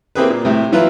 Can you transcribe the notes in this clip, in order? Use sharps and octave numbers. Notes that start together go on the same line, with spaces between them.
A#3 C4 E4 G4 G#4 B4
A#2
A2 C3
E3 F#3 E4 F4 B4